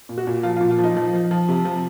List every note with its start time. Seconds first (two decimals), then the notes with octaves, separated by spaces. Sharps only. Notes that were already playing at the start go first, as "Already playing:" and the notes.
0.09 A#2
0.18 F#4
0.27 A#2
0.43 F3 F4
0.57 F4
0.61 A#2
0.71 F4
0.79 F3
0.84 D#4
0.97 F3
1.13 F3
1.31 F3
1.49 C3
1.65 F3